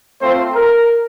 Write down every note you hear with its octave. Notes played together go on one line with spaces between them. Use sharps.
A3 C4 F4 C5
A#4